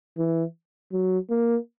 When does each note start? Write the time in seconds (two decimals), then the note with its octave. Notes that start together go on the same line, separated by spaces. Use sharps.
0.18 E3
0.92 F#3
1.30 A#3